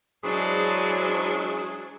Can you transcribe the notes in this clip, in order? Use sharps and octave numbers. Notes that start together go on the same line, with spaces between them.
E3 F#3 G#3 D4 G#4 C5